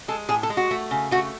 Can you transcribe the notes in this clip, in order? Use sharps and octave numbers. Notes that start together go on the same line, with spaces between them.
G#3 A4
A2 G#4
A4
G#3
F#4
A3
C#3
A3 F#4